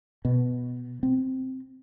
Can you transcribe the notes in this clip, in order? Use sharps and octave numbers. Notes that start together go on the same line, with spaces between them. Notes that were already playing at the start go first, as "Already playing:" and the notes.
B2
C4